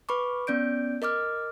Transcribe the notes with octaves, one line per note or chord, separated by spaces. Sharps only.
B4 B5 C#6 D6
B3 C#4 D5 G6 D7
A#4 D#5 D6 F6